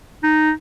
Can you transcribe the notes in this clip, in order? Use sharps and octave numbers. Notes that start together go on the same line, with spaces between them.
D#4